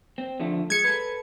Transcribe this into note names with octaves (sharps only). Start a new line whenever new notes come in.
C4
D3 F3 A3
G#3 G#6 C#7
A4 B4